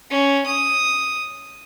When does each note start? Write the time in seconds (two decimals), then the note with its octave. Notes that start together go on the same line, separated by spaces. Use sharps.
0.11 C#4
0.46 D#6